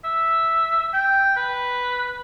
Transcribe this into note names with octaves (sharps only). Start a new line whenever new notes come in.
E5
G5
B4